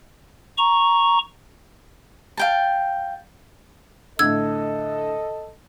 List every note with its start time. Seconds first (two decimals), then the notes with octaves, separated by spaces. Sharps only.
0.58 A#5 C#6
2.37 F5 G5 A5
4.19 A2 D3 A4 D#5 E6 G#6